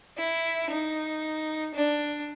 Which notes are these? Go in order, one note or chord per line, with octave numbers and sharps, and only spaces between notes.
E4
D#4
D4